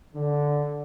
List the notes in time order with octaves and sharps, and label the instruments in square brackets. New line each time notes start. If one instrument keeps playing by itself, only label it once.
[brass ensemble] D3